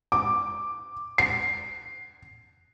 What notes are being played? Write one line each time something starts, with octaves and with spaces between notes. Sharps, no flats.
D6
C7